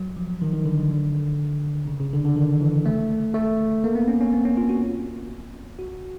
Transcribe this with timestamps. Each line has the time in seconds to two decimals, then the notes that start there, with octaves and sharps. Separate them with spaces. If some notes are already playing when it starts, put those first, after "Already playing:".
Already playing: F#3
0.17 F3
0.42 D#3
0.53 D#3
0.66 D3
0.77 D#3
0.90 D3
1.88 C#3
2.00 C#3
2.13 D3
2.25 D3
2.36 D#3
2.61 E3
2.86 A3
3.34 A3
3.84 A#3
3.95 B3
4.08 C#4
4.21 C#4
4.33 C4
4.45 C#4
4.57 F4
4.69 F#4
5.79 F#4